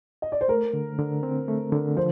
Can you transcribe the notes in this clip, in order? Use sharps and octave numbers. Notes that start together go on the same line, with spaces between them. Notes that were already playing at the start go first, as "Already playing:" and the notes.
D#5
D5
C5
A3 A#4
D3
D3
C4
A3
D3
F3 C5